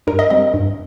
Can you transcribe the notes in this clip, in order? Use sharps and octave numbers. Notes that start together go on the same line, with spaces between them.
G2 A#4
D#5
G3 C4 D#5
G2